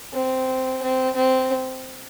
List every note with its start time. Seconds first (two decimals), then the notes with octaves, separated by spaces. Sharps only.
0.13 C4
0.83 C4
1.16 C4